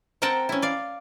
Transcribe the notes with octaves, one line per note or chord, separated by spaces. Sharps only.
C4 A#4 F#5 G5 A5
C#4 E4
D5 F5